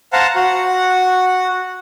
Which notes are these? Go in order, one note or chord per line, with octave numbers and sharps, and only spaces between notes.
C5 F5 F#5 A5 A#5
F#4 F#5